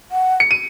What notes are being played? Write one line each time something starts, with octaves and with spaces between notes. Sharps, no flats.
F#5
C#7
D#7